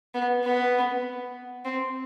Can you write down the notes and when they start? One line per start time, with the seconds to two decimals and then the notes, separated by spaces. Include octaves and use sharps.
0.15 B3
0.45 B3
1.65 C4